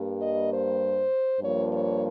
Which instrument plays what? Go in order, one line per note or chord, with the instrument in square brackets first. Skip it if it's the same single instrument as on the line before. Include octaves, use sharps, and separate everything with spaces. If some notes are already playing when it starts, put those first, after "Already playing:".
Already playing: [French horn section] G2 G3 A#3
D#5
C5
G2 F3 A#3 C#5
C#5